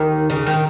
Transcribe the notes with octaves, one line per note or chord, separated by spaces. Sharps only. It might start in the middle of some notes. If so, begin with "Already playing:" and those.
Already playing: D#2 D#3
C#3
D#3